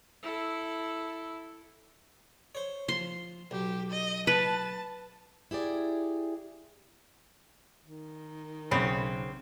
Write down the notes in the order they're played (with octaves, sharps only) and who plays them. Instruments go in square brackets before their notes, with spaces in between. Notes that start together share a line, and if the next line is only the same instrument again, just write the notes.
[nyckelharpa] E4 A4
[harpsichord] C5 C#5
[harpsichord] F3 [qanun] C6
[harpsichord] B1 [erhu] G4
[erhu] D#5
[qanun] B4 [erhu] A5
[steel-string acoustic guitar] E4 G4 G#4 D5
[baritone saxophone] D#3
[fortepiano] B1 B5 [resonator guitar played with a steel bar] C#3 C4